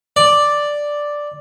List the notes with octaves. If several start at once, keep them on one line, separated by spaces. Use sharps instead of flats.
D5